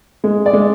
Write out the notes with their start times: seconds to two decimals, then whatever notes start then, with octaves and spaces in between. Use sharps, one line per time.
0.24 G#3
0.46 D5
0.53 G#3